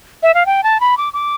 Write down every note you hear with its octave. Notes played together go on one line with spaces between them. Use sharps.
E5
F5
G5
A5
B5
D6
D6